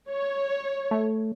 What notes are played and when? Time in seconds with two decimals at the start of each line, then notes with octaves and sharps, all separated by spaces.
0.10 C#5
0.91 A3